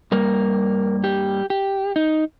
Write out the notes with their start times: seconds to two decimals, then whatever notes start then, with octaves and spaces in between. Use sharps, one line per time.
0.12 G2 G3 A#3 A#4
1.04 G4
1.50 G4
1.96 D#4